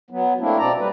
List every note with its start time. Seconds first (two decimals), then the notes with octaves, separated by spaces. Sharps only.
0.10 F#3 B3
0.40 A3 A#3 C4 D4 E4
0.59 B2 C4 D5 A#5
0.79 G3 B4